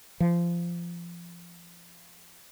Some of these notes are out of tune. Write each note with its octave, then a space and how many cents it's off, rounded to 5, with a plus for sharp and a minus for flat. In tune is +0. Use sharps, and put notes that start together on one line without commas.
F3 -20